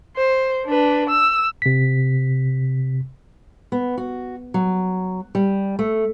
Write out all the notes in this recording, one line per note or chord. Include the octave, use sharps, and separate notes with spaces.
C5
D4 B4
E6
C3 B6
B3
F#4
F#3
G3
A3